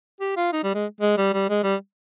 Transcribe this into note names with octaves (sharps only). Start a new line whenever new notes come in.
G4
F4
D#4
G3
G#3
G#3
G3
G3
G#3
G3